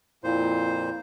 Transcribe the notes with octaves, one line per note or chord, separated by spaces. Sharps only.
F2 A#2 E4 C5